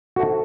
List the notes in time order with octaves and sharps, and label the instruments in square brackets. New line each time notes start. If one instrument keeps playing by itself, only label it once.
[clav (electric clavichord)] F#4 [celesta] A4 C5 E5 A5